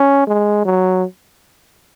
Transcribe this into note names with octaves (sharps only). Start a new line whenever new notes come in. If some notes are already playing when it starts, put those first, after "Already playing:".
Already playing: C#4
G#3
F#3